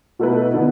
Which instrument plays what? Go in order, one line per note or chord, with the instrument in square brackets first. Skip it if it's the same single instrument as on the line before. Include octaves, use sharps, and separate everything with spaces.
[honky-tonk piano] B2 A3 E4 B4
D3 B3